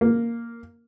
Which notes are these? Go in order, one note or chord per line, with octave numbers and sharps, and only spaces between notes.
A#3